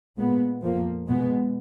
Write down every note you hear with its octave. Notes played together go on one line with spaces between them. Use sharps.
A#2 G#3 B3
F2 F3 A#3
B2 G#3 B3